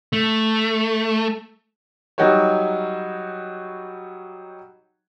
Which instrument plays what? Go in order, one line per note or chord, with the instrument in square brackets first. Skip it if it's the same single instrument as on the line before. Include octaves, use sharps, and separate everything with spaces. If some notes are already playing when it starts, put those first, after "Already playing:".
[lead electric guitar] A3
[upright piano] F#3 G3 D#4 F#4 G4 C#5